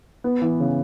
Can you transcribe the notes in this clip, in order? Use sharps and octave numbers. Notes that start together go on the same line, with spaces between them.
B3
E3
C#3